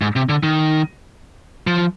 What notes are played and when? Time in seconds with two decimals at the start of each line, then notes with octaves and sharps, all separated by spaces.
0.01 G#2
0.16 C3
0.29 D3
0.43 D#3
1.67 F3